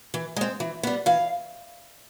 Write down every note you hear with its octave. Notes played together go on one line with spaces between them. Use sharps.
E3
G#3 C4
E3
G3 B3
E3 F5